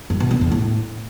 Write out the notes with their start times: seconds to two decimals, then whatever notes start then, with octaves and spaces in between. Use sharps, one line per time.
0.10 G2
0.20 B2
0.31 F#2
0.41 E2
0.52 A2